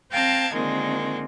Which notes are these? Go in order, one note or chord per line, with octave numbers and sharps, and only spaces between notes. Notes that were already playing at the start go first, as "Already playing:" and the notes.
C4 F5 G5 A5 A#5 G#6
A#2 D3 D#3 G#3 C4